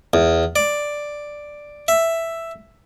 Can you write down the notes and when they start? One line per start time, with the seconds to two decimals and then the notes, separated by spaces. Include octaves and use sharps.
0.13 E2
0.56 D5
1.88 E5